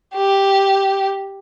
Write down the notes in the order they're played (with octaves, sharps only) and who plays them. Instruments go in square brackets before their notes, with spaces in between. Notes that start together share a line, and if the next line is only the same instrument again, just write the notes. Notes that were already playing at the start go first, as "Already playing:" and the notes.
[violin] G4